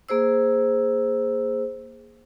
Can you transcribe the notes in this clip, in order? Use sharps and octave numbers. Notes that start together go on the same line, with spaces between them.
A#3 G#4 C5 E6